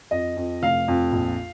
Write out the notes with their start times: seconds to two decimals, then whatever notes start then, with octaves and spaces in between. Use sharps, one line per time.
0.11 F2 D#5
0.37 F2
0.62 F1 F5
0.88 F2
1.12 A#1